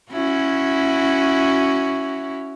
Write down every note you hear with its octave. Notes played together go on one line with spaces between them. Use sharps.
C#4 E4 F#4